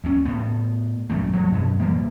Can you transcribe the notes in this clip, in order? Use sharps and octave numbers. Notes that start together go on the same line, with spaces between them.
D2 C#4
A2 B3
A#1 F#2 E3 A3
F3 F#3 A3
F#2 B2
D1 E3 G3 A#3